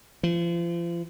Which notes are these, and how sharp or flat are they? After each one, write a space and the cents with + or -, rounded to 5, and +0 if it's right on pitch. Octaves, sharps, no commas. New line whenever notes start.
F3 -35